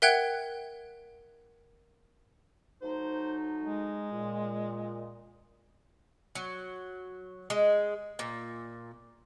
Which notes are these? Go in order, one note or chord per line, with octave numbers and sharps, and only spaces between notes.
A#4 E5 F#5 G5 F#6 G#6
F#3 A3 D#4 C5
G#3
A#2
F#3
G#3
A#2